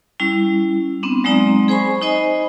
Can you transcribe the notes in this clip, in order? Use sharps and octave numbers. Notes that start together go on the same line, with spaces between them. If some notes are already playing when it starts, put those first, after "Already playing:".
G3 C#4 E4
B3 C4 D4
F#3 G#3 C4 D#4 D5 A#5
G#4 C5 G#5 B5 C#6
D#4 C5 D#5 G#5 B5